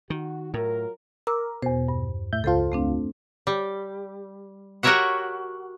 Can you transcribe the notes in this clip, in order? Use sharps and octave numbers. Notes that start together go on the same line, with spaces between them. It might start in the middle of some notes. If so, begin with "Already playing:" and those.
D#3 F#4
A2 F#3 F4 A#4
A#4 D6 E6
E2 B2 C5
G2
A2 E5 G6
C#2 F4 A4 C5 A5
A3 C4 D4
G3
F#4 G4 A#4 C#5 E5 F#5